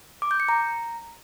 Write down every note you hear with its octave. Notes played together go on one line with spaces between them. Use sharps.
D6
G6
C#7
A#5